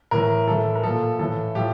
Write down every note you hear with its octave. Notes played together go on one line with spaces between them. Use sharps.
A2 E3 A#4
A2 E3 A4
A#4
A#2 F3 A4
A2 E3 A4
A2 F3 G4